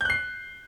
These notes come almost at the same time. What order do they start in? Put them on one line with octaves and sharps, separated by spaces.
G6 F#6 C7